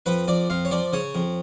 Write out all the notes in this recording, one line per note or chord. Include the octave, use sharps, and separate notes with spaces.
F2 B4
F2 D5
F2 F5
C#5
F3 D5
C#3 C#5
F2